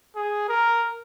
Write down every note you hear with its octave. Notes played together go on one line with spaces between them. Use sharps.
G#4
A#4